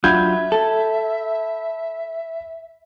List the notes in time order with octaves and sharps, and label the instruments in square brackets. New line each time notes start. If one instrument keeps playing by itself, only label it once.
[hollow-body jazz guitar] F#3 D4 F4 [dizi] E5 [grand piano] B5 G6 G#6
[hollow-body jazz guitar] A4